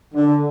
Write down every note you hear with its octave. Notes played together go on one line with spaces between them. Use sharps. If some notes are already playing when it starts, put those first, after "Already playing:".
D3